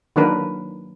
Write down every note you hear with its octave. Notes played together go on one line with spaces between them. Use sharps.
D#3 F#3 A#3 D4 A#4 B4